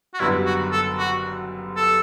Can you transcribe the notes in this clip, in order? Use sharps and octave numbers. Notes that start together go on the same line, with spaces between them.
F#4
F#1 F#2 D3 G3 B3 E4
F#4
A4
F#4
A4